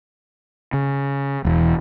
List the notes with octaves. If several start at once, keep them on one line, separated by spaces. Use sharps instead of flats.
C#3
E1 E2